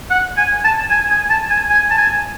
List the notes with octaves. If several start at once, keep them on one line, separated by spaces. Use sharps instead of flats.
F#5
G#5
A5
G#5
G#5
A5
G#5
G#5
A5
G#5